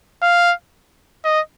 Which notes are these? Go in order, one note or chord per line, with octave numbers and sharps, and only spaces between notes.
F5
D#5